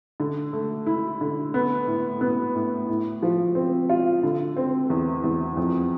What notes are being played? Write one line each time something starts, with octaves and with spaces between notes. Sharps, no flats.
D3
A3
E4
D3
B3
A2
B3
A2
A2
F3
C4
F4
D3
C4
E2
E2
F2